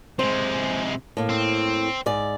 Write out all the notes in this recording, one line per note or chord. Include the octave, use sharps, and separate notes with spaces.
C3 G#3 C5
A2 A#3
C4
G#2 D5